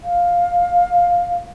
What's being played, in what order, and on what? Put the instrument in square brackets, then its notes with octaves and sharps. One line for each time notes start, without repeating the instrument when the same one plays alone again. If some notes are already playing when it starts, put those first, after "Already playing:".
[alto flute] F5